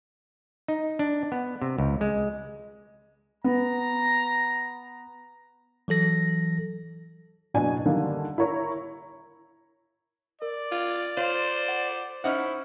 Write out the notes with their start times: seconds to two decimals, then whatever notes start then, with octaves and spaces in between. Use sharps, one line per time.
0.68 D#4
0.99 D4
1.32 B3
1.62 C3
1.78 C#2
2.01 G#3
3.44 B3 A#5
5.88 E3 F#3 A4 A#6
7.54 F#1 B2 D4 D5 G#5
7.86 D3 D#3 G3 A#3 D4
8.38 E4 A#4 C#5 A#5
10.42 A#4 D5
10.72 F4
11.17 F4 C5 C#5 F5
11.68 F#5
12.24 C#4 D#4 E4 C5 E5 F#5